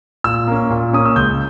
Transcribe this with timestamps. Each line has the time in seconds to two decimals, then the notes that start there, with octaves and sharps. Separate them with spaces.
0.24 A#2 E6
0.47 A#3 C#4
0.70 A#2
0.93 A#3 C#4 D#6
1.05 E6
1.16 C#2 G6